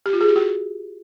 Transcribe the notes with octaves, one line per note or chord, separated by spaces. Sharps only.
G4
F4
G#4
G4
F#4